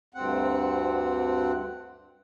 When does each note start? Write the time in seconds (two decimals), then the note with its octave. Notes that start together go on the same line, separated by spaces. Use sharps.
0.15 D2 G2 C4 F#5